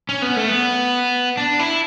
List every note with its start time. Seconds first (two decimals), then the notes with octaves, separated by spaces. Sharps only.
0.09 C#4
0.22 B3
0.36 A3
0.49 B3
1.37 D4
1.59 E4